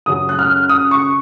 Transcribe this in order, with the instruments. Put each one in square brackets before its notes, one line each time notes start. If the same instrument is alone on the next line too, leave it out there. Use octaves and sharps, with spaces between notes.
[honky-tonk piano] F#2 C#3 F#3 D#6
F#6
F6
D#6
C#6